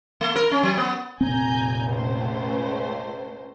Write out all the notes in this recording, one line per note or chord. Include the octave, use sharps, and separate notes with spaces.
A3
A#4
C#4
F#3
B3
F1 A#2 C4 G#5 A#5 G6
C#2 A3 C5